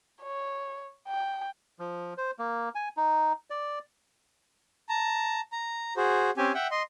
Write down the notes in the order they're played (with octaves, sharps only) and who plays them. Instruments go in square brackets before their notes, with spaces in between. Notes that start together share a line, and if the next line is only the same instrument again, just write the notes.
[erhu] C#5
G5
[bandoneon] F3
C5
A#3
G#5
D#4
D5
[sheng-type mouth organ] A5 A#5
A#5
F#4 G#4 C5
C4 C#4 G4 G#5
E5 F#5 G5
D#5 C6